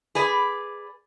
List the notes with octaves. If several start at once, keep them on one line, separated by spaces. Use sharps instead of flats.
G#4 B4 D5